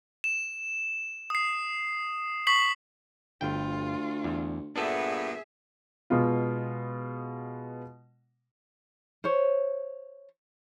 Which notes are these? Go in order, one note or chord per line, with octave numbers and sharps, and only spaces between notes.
E7
D#6 C7
C#6 B6 C7 F#7
G1 D2 F4 G5
E2
G2 A#2 B3 D4 G#4 A4 E5
B2 G#3 B3 F4
C5 C#5